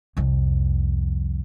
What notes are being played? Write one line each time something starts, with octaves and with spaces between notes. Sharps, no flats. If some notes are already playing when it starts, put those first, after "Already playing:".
C2 F2